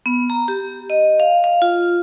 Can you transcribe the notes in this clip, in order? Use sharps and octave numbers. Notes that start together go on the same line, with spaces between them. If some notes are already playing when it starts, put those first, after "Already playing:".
B3
A#5
G4
D#5
F5
F5
F4